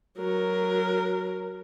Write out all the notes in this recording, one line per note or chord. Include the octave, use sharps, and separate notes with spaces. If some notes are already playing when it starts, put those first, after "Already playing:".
F#3 A#4